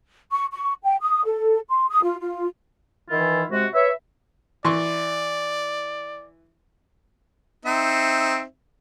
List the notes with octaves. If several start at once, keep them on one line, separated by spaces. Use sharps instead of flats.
C#6
C#6
G5
D#6
A4
C6
D#6
F4
F4
D#3 E3 E4 F4
C3 G#3 F#4
B4 C#5 E5
E3 D5 C6 C#6
C4 D#4 E5